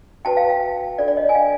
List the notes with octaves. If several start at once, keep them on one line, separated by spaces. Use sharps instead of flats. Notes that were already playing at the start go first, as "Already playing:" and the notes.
F#4 B4 G5 A5
F5 G5
F5 G5
D4 F4 A4 C5 D5
D5
C#5 D#5
G#5
F5 G5